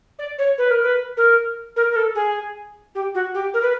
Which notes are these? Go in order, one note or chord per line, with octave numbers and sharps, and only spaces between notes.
D5
C#5
B4
A#4
B4
A#4
A#4
A#4
A4
G#4
G4
F#4
G4
A#4
B4